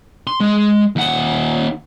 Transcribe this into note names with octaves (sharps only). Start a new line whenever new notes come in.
C6
G#3
D#2 F#5